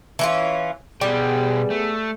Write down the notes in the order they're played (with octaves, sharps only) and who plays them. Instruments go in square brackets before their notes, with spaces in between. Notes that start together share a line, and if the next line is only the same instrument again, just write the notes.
[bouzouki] E3 C#4 F4
[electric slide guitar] B2 D5 G5 [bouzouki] G3 [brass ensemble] B3 G#4
[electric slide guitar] A3